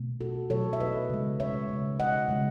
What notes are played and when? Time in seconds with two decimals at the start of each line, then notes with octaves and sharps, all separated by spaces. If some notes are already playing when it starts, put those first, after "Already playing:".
Already playing: B2 A3
0.21 F#4 A4
0.50 B2 F#3 A3 A4 C#5
0.73 E5
0.80 B4 D#5
1.10 C#3 G#3
1.40 C#5 E5
1.69 C#3 G#3
2.00 D#5 F#5
2.29 C#3 G#3